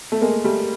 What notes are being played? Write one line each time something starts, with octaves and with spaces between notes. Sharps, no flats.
A3
G#3 A#3
G3 A3